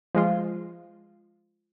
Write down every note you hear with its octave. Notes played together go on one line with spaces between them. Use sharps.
F3 G#3 F4